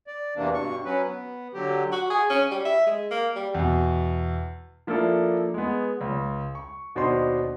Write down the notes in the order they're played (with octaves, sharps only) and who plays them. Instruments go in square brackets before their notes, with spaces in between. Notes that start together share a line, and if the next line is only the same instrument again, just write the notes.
[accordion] D5
E2 C3 E3 A#3 D4
G2 B2 C#6
F#3 C#4 B4
B3
D3 F#3 G4
[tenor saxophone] F#4
G#4
C#4
G3
E5
G#3
A#3
G3
[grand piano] E2 B2
F3 A#3 D4 E4 A4
G#3 B3
C#2
C#6
D#2 B2 D4 C5 D#5 C6